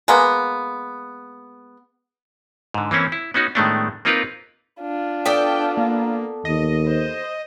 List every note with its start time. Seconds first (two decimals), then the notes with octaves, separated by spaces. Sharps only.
0.08 G#3 A#3 B3
2.74 G#2 D3
2.91 E3 A#3 C4 C#4 E4
3.12 E4
3.34 B3 C#4 D#4 F#4
3.55 A2 D#3 G#3 A3 B3 D4
4.05 A#3 C4 D#4 F4 A#4 B4
4.81 D4 F4
5.26 B3 A4 D5 G5
5.77 A#3
6.45 D#2 D#5
6.87 C5